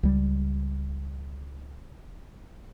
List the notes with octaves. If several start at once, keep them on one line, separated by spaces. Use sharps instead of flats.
C#2 G3